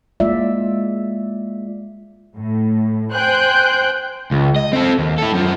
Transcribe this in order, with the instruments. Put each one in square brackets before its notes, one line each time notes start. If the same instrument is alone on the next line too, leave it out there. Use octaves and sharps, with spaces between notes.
[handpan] G#3 A#3 F4 D5 E5
[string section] A2
C5 G5 G#5 F#6 G6
[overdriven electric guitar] C#2
D#5
C4 A4
D#2
E4 A4
F#2 F3